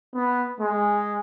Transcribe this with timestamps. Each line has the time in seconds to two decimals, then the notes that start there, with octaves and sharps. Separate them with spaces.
0.14 B3
0.61 G#3